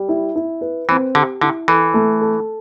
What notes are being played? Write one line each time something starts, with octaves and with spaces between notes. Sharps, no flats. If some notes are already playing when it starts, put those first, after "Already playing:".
Already playing: G3
E4
E4
B4
E3 C4
D3 G4
D3 E4
E3 A4
A3
A4